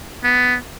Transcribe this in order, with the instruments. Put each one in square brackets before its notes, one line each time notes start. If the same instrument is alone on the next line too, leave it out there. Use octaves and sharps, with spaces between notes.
[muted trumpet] B3